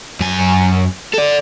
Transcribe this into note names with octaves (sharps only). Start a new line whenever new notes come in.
F#2 G#5
A4 D5